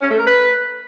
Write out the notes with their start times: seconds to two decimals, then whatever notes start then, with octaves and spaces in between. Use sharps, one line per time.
0.01 C#4
0.09 A3
0.17 A#4
0.26 B4